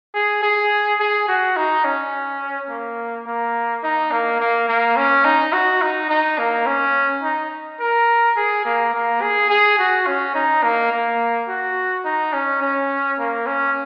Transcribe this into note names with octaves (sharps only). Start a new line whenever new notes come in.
G#4
G#4
G#4
F#4
D#4
C#4
A#3
A#3
D#4
A#3
A#3
A#3
C#4
D#4
F#4
D#4
D#4
A#3
C#4
D#4
A#4
G#4
A#3
A#3
G#4
G#4
F#4
C#4
D#4
A#3
A#3
F#4
D#4
C#4
C#4
A#3
C#4